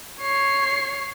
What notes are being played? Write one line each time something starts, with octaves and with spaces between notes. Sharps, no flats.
C#5 C7